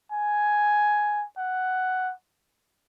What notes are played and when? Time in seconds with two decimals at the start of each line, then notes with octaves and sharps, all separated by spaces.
0.12 G#5
1.37 F#5